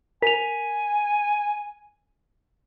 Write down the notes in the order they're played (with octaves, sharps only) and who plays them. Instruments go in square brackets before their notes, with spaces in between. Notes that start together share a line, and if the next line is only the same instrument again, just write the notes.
[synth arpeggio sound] A#4 [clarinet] G#5 [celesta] B6 F7